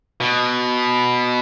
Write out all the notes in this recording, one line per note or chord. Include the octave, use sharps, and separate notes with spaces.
B2